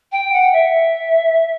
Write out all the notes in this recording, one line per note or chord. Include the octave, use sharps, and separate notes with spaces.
G5
F#5
E5